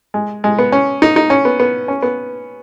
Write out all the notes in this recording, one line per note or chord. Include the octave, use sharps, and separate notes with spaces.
G#3
G#3
B3
C#4
D#4
D#4
C#4
B3
B3
C#4
B3